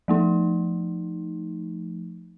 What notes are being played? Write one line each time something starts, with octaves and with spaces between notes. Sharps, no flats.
F3 A3 D#4